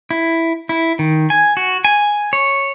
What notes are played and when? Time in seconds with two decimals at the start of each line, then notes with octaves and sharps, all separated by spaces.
0.11 E4
0.69 E4
0.99 D#3
1.30 G#5
1.57 F#4
1.85 G#5
2.33 C#5